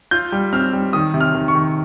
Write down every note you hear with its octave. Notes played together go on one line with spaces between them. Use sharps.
F4 G6
G3
C4 F6
G3
D#3 D#6
C3
F6
D#3
C#6
D#3